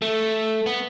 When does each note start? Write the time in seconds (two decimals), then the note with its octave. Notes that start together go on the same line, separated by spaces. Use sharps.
0.02 A3
0.66 B3